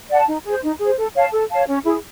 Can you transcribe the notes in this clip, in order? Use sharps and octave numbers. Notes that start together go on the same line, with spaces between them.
D5 F#5 A5
D#4
G#4 C5
D#4
G#4 C5
A4
C#5 F5 A5
A4
C#5 F5 A5
C#4
E4 G#4